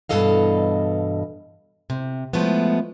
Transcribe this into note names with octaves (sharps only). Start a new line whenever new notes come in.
G2 B2 E3 A4 D#5 F5
C3
F3 G#3 A3 B3